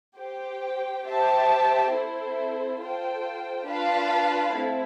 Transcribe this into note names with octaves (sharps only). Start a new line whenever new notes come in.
G4 C5 G5
G4 C5 E5 A5
C4 E4 A4 C5
F4 A4 C5 G5
D4 F4 B4 F5 A5
A3 C4 E4